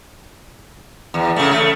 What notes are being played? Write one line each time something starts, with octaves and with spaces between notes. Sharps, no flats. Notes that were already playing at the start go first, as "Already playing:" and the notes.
E2
C#3 A3
A3